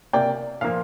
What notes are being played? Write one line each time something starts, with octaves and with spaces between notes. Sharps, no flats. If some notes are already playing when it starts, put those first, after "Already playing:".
C3 A#3 D5 G5
A#2 F3 A#3 F5